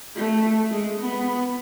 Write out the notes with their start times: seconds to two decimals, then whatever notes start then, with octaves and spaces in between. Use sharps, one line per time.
0.15 A3
0.71 G#3
1.00 B3